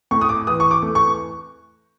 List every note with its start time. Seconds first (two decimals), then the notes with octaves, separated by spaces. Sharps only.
0.11 A2 C#6
0.21 D#6
0.29 D6
0.47 E3 D#6
0.60 C#6
0.71 D6
0.83 A3
0.95 C#6